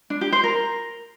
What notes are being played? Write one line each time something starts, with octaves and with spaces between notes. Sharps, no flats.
D4
G4
C5
A#4